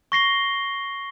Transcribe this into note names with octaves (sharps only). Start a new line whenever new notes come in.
C#6 A#6 C7 G7